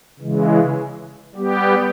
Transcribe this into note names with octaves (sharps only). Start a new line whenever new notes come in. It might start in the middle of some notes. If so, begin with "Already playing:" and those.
C#3 E3 G#3
G3 B3 G4